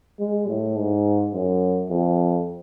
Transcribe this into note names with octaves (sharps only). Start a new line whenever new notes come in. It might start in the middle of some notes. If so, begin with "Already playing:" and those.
G#3
A2
G#2
F#2
F2